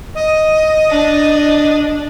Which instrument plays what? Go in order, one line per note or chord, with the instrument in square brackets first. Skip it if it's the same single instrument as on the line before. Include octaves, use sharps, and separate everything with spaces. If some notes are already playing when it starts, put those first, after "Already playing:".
[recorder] D#5
[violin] D4